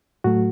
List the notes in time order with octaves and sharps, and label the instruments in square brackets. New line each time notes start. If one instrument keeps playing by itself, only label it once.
[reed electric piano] A2 F#3 A3 F#4